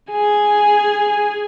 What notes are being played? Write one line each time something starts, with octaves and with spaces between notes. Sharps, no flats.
G#4 G#5